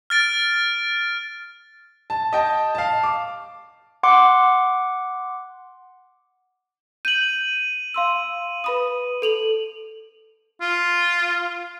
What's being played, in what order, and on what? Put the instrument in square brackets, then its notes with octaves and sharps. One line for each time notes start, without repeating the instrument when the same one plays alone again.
[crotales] F6 A6 D7
[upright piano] A5
D#5 G5 A5
F5 A5
D6
[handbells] F#5 C6 D6
[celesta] G6 [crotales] D#7 F#7
[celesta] F5 C6 E6
B4 B5 D#6
A4 F7 F#7
[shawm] F4